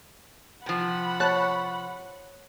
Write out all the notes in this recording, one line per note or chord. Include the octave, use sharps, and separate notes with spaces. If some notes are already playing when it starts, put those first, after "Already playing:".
C3 F3 F#5 B5
C#5 A5 F#6